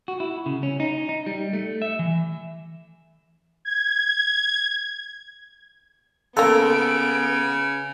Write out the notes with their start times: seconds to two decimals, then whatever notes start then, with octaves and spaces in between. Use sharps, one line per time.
0.08 F#4
0.20 E4
0.46 C#3
0.63 C#4
0.80 D#4
1.09 D#4
1.26 G3
1.53 A3
1.82 E5
1.99 E3
3.65 G#6
6.37 C#3 G#3 A#3 B3 F4 A4 D7